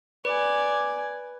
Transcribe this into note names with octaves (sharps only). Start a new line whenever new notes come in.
B4 D5 G#5